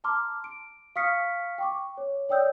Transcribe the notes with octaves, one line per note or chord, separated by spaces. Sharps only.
A5 A#5 C6 D6 F6
D7
F5 C#6 D#6 F6 B6 C#7
G5 C#6 D6
C#5
C#5 D5 G5 D#6 E6 G6